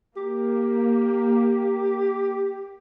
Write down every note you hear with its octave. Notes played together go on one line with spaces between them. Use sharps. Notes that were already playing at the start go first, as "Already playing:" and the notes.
A#3 G4